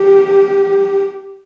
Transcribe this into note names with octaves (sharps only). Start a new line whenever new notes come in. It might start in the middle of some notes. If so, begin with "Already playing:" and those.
Already playing: G4